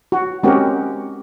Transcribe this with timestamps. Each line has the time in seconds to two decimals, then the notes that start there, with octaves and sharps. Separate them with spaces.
0.12 F#4
0.43 G#3 C4 C#4 F#4 G4 A#4